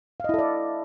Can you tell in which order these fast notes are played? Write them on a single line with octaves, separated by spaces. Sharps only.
F5 D#5 E4 A4 D5